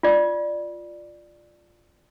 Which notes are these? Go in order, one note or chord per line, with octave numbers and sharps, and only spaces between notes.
F4 D5